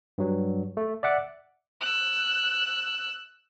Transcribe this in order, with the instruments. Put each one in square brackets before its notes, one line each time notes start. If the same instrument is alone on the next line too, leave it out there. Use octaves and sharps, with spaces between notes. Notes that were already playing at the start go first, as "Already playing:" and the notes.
[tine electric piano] G2 F#3
A3
D5 E5 F#5 D6
[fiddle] E6 F#6